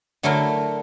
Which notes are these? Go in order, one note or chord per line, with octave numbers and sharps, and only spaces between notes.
D3 F#3 A3 E4 F#4 A#4